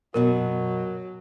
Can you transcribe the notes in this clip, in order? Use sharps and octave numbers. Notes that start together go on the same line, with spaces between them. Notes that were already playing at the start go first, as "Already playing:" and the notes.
F#2 B2 F#3 F#4 A#4